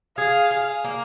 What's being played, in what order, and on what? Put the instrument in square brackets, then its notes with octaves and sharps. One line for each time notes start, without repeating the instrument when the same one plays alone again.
[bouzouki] G#4 [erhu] F5
[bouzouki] G#4
A#3